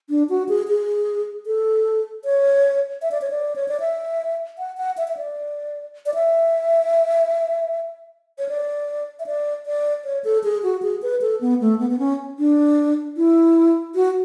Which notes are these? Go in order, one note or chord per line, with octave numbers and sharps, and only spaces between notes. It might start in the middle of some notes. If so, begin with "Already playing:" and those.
D4
F#4
G#4
G#4
A4
C#5
E5
D5
C#5
D5
C#5
D5
E5
F#5
F#5
E5
E5
D5
D5
E5
C#5
D5
E5
D5
D5
C#5
A4
G#4
F#4
G#4
B4
A4
B3
A3
B3
B3
C#4
D4
E4
F#4